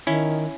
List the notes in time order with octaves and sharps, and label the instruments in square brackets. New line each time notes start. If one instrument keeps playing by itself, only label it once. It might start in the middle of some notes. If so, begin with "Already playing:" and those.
[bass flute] D#3 [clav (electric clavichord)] C#4 E4